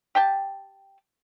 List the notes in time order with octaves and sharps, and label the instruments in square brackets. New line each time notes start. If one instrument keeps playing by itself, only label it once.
[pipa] G4 G5 A5